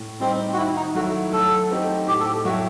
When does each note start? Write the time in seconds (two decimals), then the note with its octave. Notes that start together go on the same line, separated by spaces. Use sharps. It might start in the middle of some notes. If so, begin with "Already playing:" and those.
Already playing: A2
0.20 G3 C4 D#4 G4
0.53 F#4
0.57 D#3 E4
0.76 D#4
0.95 F#3 A3 E4 F#4
1.33 F#3 A4
1.70 A3 C4 D#4 G4
2.07 A2 G4
2.20 A4
2.26 G4
2.45 F#3 A3 E4 F#4 G4